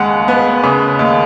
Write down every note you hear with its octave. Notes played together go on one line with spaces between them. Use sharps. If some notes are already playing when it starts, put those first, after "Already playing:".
Already playing: D#2 C#3 G#3 F#5
B3
C#3
D#2